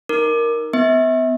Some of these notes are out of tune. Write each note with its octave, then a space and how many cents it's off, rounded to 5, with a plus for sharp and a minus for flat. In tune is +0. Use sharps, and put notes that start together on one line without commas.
D#4 +0 A#4 +0 D6 +20
B3 +35 E5 -30